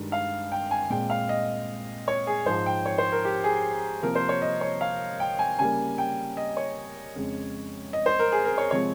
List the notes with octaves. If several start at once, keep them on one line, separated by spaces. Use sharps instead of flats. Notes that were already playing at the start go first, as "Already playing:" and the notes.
Already playing: G2 D#3 G#3
F5
G5
G#5
A#2 G#3 C4 G5
F5
D#5
C#5
G#4
G#2 F3 G#3 C5
G5
C#5
C5
A#4
G4
G#4
C3 F3 A#3 A#4
C5
C#5
D#5
C#5
F5
G5
G#5
C#3 G3 A#3 G#5
G5
D#5
C#5
F2 C#3 G#3
D#5
C5
A#4
G#4
A#4
C#5
C3 F3 G#3 C4 C#5